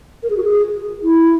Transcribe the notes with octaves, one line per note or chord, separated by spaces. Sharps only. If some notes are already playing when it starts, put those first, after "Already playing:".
A#4
G#4
F#4
G#4
E4